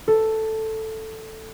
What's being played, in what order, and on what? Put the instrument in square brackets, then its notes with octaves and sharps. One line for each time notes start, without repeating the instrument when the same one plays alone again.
[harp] A4